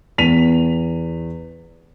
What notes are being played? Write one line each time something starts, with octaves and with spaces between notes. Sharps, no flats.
E2 B6 D#7 F7